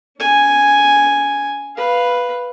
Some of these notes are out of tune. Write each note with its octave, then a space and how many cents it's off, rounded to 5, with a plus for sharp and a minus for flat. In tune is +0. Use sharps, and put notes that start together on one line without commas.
C#4 +40 G#5 +0
B4 +0 F5 +0